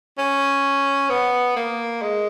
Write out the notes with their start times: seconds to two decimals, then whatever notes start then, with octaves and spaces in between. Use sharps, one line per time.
0.18 C#4
1.10 B3
1.56 A#3
2.02 G#3